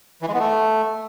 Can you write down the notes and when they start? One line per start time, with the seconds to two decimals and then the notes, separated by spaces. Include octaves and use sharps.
0.22 E3
0.28 G#3
0.34 B3
0.39 A3